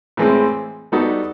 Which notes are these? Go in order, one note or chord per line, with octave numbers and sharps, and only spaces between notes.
A2 E3 G#3 C4
G3 B3 D#4 F#4 A4